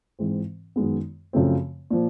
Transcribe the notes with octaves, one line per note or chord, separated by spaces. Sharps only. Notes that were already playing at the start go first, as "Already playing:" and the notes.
G#2 E3 G#3 C4
F#2 D#3 G#3 B3
F#2 C#3 F3 A3 C4
A#2 F3